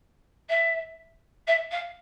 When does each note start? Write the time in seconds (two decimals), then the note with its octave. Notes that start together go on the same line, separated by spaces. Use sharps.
0.49 E5
1.47 E5
1.71 F5